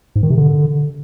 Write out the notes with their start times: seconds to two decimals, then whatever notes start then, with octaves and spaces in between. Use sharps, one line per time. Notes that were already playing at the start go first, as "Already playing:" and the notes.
0.16 G#2
0.23 D#3
0.30 C3
0.38 D3